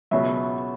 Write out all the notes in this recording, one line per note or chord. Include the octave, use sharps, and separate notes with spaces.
C#2 B2 F#3 E5